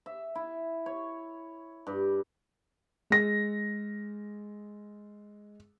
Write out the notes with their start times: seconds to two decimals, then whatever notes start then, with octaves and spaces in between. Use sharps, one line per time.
0.06 E5
0.35 E4
0.86 C#5
1.87 G2
3.10 G#3 A#6